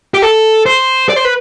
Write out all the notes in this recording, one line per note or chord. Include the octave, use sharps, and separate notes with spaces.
G4
A4
C5
D5
C5
B4